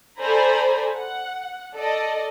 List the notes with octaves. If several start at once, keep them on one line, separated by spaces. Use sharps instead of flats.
A4 C5 D5 G#5 A#5 B5
F#5
A4 D5 D#5